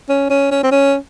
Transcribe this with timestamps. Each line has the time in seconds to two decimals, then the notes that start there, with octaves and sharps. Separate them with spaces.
0.09 C#4
0.30 C#4
0.51 C#4
0.63 C4
0.71 C#4